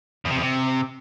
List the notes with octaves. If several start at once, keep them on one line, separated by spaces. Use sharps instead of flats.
E2
C3
E2
C3